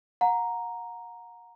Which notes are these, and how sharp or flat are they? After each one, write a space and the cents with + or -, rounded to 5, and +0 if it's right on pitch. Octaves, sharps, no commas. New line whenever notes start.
F#5 -35 A#5 +0